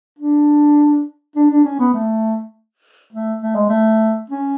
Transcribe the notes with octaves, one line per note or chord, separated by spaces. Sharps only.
D4
D4
D4
C#4
B3
A3
A3
A3
G#3
A3
C#4